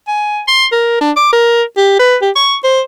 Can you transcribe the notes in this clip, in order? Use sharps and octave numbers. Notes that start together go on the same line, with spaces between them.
G#5
C6
A#4
D4
D6
A#4
G4
B4
G4
C#6
C5